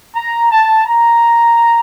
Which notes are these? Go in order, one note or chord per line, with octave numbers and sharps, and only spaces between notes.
A#5
A5
A#5